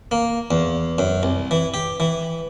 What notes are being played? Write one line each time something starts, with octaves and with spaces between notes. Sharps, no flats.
A#3
E2
F#2
C2
E3
G4
E3